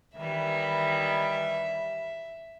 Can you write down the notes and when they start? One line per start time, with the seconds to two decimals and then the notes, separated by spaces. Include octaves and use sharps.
0.17 D#3 E3 G3 E5